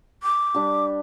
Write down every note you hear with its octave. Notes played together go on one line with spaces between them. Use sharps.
D6
G3 D4 G4